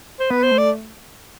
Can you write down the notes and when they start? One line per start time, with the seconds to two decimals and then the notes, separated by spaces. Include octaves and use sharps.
0.20 C5
0.30 B3 B4
0.43 C5
0.51 A3
0.58 D5